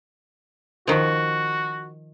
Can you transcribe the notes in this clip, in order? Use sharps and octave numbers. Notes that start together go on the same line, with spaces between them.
D#3 F3 F#4